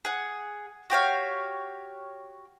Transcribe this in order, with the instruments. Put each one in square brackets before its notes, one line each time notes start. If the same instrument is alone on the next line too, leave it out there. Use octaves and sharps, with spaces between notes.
[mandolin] G#4 F#5
F#4 G4 C#5 F5